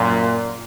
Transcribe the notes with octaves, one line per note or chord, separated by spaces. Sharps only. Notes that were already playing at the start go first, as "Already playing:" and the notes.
Already playing: F#2 A#2